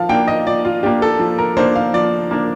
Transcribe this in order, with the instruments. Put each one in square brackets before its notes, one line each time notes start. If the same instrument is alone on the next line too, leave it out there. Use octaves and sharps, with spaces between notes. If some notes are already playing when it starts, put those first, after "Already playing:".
Already playing: [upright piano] F3 F5 A5
A#3 D4 G5
D#5
F3 D5
F4
A#3 D4 G4
A4
F3
A#4
A#3 D4 C5
F5
F3 D5
A#3 D4